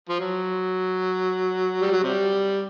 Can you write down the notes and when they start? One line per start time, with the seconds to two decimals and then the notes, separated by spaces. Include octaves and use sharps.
0.09 F3
0.20 F#3
1.81 G3
1.92 F#3
2.04 C3 G3